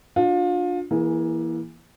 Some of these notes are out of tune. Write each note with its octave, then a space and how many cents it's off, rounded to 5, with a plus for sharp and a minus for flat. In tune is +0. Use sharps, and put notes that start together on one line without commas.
D4 +0 F4 +30
E3 +0 A#3 +30 G#4 +0